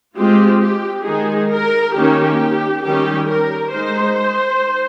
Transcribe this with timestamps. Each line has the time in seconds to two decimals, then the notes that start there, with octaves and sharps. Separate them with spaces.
0.17 G#3 C4 F4 G4
0.61 G4
1.06 D#3 G#3 D#4 G#4
1.51 A#4
1.95 D#3 A#3 C#4 G4
2.84 D#3 G3 C#4 G4
3.29 A#4
3.73 G#3 D#4 C5